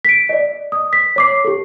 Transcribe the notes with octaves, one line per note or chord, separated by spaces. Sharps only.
B6 D7
D5 D#5
D#6
B6
C#5 D6 C7
G4 A4